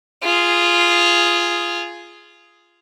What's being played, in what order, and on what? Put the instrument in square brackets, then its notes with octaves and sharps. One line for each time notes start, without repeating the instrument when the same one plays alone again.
[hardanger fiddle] F4 G#4